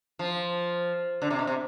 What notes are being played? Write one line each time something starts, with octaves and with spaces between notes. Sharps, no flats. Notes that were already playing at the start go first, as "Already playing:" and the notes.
F3
D3
C3
B2
C3